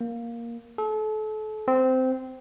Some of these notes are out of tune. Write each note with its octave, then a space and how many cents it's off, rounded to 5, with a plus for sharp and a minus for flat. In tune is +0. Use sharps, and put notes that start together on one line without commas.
A#3 +5
A4 -35
C4 -15